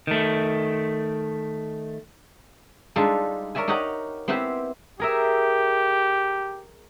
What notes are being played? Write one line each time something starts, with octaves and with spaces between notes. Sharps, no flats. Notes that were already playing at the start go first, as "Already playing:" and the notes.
D#3 A3
G3 G#3 D4 D#4 F4 A4
A#4 C#5 D5 E5 G#5
D#4 G4 C#5 D#5 F#5 A#5
B3 C4 E4 G4 B4 C5
G4 G#4 A#4 E5